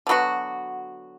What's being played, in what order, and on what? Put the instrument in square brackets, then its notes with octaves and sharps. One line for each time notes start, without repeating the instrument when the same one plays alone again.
[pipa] D3 F#3 B3 F#4